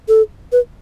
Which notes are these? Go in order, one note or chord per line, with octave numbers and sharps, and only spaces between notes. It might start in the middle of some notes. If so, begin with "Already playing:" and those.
A4
B4